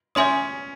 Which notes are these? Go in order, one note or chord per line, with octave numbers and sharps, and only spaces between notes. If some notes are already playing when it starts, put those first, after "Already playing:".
C#4 C#5 E5 G#5 C6 D#6